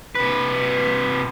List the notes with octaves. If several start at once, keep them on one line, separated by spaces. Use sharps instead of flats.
C3 B4